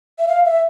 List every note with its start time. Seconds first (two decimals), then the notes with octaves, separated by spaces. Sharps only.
0.19 E5
0.28 F5
0.45 E5